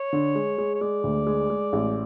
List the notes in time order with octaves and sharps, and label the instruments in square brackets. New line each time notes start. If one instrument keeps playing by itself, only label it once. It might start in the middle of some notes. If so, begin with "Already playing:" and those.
Already playing: [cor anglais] C#5
[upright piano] D3
G#3
G#3
[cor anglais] C#5
[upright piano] G#3 [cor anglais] D5
[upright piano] D2
G#3
G#3
A1